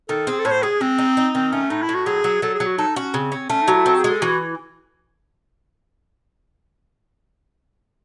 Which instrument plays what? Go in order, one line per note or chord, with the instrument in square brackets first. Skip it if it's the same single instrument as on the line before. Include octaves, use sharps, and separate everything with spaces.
[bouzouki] D#3 [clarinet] A4
[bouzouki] C4 [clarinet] G#4
[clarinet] A4
[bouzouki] A2 [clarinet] C#5
[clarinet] C5
[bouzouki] G#3 [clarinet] G#4
[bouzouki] G#3 [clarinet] C4
[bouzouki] D#4
D#4
[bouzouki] D#3 [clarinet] C4
[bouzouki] A3 [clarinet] C#4
[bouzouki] A2 [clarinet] D#4
[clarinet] E4
[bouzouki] A2
[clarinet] F#4
[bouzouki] F#3 [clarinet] G#4
[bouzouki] F#3
[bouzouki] F#3 [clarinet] A4
[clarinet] G#4
[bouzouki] F#3
[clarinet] F#4
[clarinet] D#4 [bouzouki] A4
[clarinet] C#4 [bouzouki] F#4
[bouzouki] C#3 [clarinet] C4
[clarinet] C4 [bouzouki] C#4
[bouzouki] A3 [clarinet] C#4
[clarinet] D#4
[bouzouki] F#3
[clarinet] E4
[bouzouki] C4 [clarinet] F#4
[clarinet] G#4
[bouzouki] G#3
[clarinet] A4
[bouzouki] E3 [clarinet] F#4